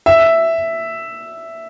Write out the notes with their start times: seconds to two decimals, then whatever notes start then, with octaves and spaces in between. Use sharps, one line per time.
0.06 E5